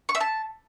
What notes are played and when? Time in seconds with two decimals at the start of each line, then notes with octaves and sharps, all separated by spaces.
0.09 C#6
0.15 E5
0.20 A5